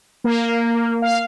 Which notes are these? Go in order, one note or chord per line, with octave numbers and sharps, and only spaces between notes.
A#3
F5